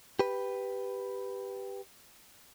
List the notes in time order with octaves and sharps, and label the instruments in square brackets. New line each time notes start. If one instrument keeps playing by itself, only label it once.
[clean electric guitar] G4 B4